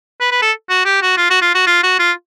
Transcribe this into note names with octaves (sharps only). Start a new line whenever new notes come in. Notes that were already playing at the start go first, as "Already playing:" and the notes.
B4
B4
A4
F#4
G4
F#4
F4
F#4
F4
F#4
F4
F#4
F4